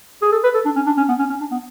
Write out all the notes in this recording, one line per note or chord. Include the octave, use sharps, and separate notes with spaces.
G#4
A4
B4
A4
D4
C#4
D4
C#4
B3
C#4
C#4
D4
B3